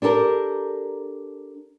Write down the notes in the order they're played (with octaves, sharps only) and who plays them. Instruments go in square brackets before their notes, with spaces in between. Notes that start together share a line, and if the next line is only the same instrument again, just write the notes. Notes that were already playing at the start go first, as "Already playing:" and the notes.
[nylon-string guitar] D4 G4 A4 A#4